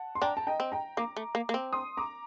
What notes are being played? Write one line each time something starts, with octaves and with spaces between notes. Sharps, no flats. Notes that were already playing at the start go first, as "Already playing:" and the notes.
Already playing: F#5 A5
C6
D4 G5 A#5
A5
D#5 G5
C4
G5 A#5
A#3 A#5 D6
A3
A#3
A#3
C4
C6 D#6
A#5 D6